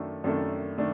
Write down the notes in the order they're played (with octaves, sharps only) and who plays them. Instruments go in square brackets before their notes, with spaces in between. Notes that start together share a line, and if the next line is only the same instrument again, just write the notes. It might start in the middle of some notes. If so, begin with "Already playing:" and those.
Already playing: [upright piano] F#2 D#3 A3 D4 A4
F#2 D#3 A3 D4 A4
D#3 A3 D4